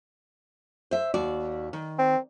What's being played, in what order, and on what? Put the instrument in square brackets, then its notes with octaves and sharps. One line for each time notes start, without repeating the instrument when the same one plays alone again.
[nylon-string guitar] C5 E5
D#2 F#4 D5
D#3
[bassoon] C4